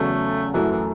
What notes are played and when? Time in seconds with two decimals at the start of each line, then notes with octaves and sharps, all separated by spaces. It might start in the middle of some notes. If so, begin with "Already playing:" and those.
Already playing: E2 C#3 F#3 A3 C#4 A4
0.54 F#2 E3 F#3 A3 E4
0.72 E3